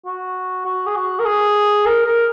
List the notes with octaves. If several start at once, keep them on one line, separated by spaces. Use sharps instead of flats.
F#4
F#4
G#4
F#4
A#4
G#4
A#4
A#4